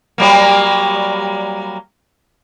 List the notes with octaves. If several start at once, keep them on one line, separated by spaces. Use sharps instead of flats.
F#3 G3 A#3